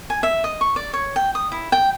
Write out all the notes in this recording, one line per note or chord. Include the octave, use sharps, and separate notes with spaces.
G#5
E5
D#5
C#6
D5
C#5
G5
D#6
E4
G5